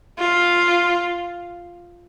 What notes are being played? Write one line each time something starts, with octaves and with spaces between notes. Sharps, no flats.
F4